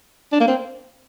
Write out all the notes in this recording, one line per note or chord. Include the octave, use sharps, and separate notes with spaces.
D4
A#3
C4